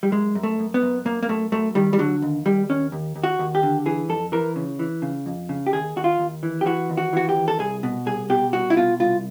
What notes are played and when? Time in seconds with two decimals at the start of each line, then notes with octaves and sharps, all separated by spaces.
0.03 G3
0.12 F#2 G#3
0.35 F#2
0.43 A3
0.59 F#2
0.74 B3
0.82 F#2
1.05 F#2 A#3
1.23 A#3
1.29 F#2 A3
1.52 F#2 A3
1.75 D#3 G3
1.93 G3
1.99 D3 F#3
2.22 D#2
2.45 D#2 G3
2.69 D#2 C#4
2.92 D#2
3.16 D#2
3.24 F#4
3.39 D#2
3.55 G4
3.63 D3
3.86 E3 G#4
4.09 F2 A4
4.32 E3 A#4
4.56 C#3
4.79 E3
5.02 C#3
5.26 F2
5.49 C#3
5.67 G4
5.73 D#2 G#4
5.96 D#2 F#4
6.04 F4
6.20 D#2
6.43 E3
6.61 G4
6.66 E3 F#4
6.90 D#2
6.98 F#4
7.13 E3 F#4
7.29 G4
7.37 D#2
7.48 A4
7.59 C2 G#4
7.83 B2
8.06 C2 G#4
8.30 B2 G4
8.53 C2 F#4
8.70 E4
8.77 B2 F4
9.00 C2 F4